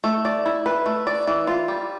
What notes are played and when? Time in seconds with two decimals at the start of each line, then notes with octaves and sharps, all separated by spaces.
0.04 A3
0.25 D5
0.46 E4
0.66 B4
0.86 A3
1.07 D5
1.27 E3
1.47 F4
1.68 G3